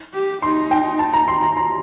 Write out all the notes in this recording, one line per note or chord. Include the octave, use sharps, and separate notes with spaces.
G4
D#4 C6
G5
A5
A#5
C6
A#5
A#5